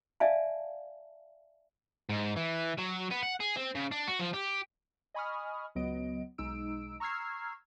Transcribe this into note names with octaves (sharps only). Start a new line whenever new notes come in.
D5 E5 F5 G#5 A5
G#2
E3
F#3
B3
F#5
G#4
C4
C#3
D4
F#4
F3
G4
D#5 G#5 B5 C#6 D#6 F6
C#2 F#3 B3 D#5 D7
B1 G#3 D#4 E6 D7
A#5 C#6 E6 F6 G#6 C7